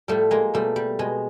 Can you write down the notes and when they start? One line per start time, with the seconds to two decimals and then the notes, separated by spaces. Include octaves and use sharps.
0.08 A2 F3 G3 A3
0.31 G#3 A#3
0.54 B2 G3 A3
0.76 G3
0.99 B2 G#3